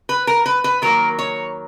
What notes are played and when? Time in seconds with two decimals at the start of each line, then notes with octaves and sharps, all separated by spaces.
0.09 B4
0.27 A#4
0.46 B4
0.64 B4
0.82 D#3 F#3 A#3 A#4
1.19 C#5